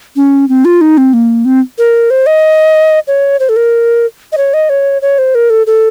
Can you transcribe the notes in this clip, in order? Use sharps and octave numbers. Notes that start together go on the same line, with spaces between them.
C#4
C4
F4
D#4
C4
A#3
C4
A#4
C5
D#5
C#5
C5
A4
A#4
D#5
C#5
D#5
C#5
C#5
C5
A#4
A4
A4